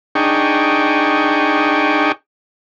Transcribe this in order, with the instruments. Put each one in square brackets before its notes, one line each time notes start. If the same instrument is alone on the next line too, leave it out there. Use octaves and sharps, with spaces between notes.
[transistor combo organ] D4 D#4 G#4 G5 C#6